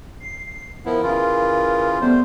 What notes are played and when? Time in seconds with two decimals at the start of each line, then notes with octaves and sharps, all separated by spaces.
0.20 C7
0.86 F3 B3 E4 A#4
1.03 C#3 E3 F4
2.01 G3 A3 B3 C5